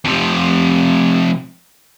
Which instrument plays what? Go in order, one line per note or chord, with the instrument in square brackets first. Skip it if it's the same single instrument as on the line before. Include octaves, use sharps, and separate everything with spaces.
[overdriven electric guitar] F2 C3